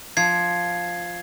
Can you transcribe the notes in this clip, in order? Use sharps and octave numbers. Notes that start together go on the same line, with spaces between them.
F3 G#6 C7